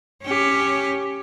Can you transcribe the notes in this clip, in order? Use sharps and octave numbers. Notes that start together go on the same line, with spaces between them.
C#4 G4